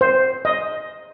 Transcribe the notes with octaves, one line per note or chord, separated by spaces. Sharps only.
C5
D#5